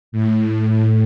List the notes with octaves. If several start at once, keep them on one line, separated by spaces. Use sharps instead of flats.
A2